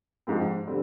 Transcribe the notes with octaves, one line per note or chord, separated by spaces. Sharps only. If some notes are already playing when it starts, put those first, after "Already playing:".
G#2 F3 G#3 C4
D3 G3 C4